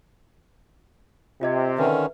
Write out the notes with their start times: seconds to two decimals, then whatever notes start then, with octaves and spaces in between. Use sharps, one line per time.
1.41 C3 F4 D#5 G#6
1.78 D3 D#3 C#4 B4 E5